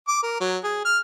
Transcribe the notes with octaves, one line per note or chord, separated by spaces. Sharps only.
D6
A#4
F#3
G#4
F6